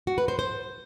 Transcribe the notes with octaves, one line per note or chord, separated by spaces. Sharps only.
F#4
B4
C5
C5